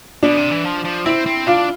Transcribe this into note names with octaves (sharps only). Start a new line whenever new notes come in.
B2 D4
C3
E3
F3
F3
C4 E4
C4
D4 F4